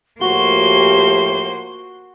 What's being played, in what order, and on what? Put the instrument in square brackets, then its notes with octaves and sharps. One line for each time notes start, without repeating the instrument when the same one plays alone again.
[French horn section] A2 F3 G4 [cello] A#3 C5 [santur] F#4 [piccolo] G7